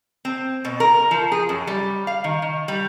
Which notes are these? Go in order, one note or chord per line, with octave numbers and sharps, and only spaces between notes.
C4
B2
A#4
F3
G#4
F#2
G3
F5
D#3
D#3
G3